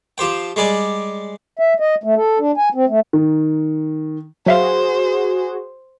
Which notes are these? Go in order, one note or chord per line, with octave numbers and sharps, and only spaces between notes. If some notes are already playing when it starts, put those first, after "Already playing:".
F3 G4 C5 G5
G3 G#3 D5 G#5
E5
D#5
A3
A4
D4
G#5
C4
A3
D#3
F#3 F#4 G#4 C5 E5 F5